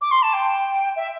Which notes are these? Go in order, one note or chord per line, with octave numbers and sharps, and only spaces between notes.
D6
C6
A5
G5
E5